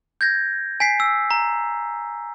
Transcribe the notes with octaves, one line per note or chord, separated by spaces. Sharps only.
G6 G#6 A#6
G#5 B6 C7
E6
A#5